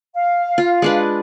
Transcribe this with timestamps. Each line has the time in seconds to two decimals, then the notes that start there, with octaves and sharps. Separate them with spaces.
0.14 F5
0.58 F4
0.82 G#3 D4 B4